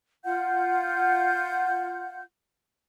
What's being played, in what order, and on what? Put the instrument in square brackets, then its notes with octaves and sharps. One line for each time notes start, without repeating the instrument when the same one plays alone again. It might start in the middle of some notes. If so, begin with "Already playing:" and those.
[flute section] F4 F#5 G6